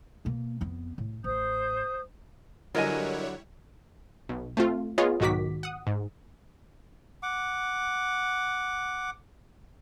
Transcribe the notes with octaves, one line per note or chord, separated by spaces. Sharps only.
B2 A#3
F2 B3
A2
A1 C5 D#6 G6
D3 F#3 G3 E4 A#4 C#5 D#5 G#5
B1
A3 C4 F4
B3 F4 G#4 C#5 D#5
B1 G#2 D#3 F#4 D6 B6
F#5 D#6
G#2
F#5 D6